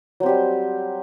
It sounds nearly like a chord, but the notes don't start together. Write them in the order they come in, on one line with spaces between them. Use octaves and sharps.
F#3 C4 G4 G3